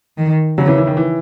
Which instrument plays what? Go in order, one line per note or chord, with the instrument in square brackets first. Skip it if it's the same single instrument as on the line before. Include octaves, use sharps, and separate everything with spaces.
[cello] D#3
[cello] C#3 [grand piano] F#3
[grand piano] E3
E3
D#3
E3